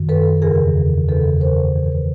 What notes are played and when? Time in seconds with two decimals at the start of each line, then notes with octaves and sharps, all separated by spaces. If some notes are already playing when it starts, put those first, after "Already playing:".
Already playing: F#2 D#3
0.09 A4 B4
0.42 E2 C#3 E3 G#4 A#4
1.08 E2 C#3 E3 A4 B4
1.41 A#4 C5
1.75 G#2 E3
1.84 A#4
1.92 B4